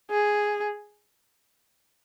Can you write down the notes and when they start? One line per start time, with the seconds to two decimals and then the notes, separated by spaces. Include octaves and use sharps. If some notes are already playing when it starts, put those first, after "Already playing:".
0.11 G#4